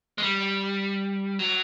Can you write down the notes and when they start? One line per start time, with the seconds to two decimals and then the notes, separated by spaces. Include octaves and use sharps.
0.18 G#3
0.23 G3
1.39 F#3